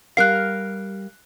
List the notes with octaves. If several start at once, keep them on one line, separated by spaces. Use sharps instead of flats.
G3 G4 A#4 F5 F#6 C7